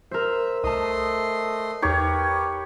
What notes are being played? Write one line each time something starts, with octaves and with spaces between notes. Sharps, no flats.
A#4 C5 E5
C2 A3 D#5 A5 C6 D#6
E2 D#4 G4 A#4 B4 C#5